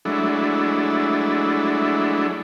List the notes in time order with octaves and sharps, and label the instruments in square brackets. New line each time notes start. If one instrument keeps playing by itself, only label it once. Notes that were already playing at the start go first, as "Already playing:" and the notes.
[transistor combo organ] F#3 G#3 A3 D4 E4